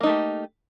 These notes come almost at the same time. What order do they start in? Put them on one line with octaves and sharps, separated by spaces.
A#3 D#4 A3 G4